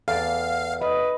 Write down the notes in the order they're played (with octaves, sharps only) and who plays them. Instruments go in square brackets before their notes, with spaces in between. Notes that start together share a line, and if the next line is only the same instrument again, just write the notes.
[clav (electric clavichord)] E2 D5 [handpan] A4 [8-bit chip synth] F5
[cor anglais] B4 [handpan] D#5